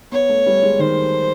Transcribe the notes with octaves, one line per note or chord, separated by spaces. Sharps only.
B3 C#5
A3
G3
G#3
D#3 C5